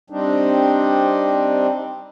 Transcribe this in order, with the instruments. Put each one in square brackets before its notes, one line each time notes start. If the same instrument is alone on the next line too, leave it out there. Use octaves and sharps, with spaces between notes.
[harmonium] G3 C4 D4 D#4